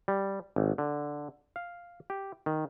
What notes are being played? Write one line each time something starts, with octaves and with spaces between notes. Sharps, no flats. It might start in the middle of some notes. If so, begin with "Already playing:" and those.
G3
G#1
D3
F5
G4
D#3